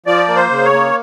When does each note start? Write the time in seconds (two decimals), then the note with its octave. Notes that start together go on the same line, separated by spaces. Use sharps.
0.06 F3 D5
0.28 A#3
0.36 C5
0.51 C#3
0.65 C#5
0.73 A#3